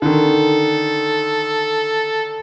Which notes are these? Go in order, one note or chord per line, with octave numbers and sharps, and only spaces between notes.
D3 D#3 A4